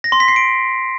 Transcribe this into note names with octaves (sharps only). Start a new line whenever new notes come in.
A#6
C6
B6
C7
D7